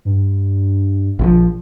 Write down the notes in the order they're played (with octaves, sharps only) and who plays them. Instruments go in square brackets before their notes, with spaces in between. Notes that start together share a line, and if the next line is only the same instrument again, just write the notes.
[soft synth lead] G2
[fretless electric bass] A#1 C#3 F3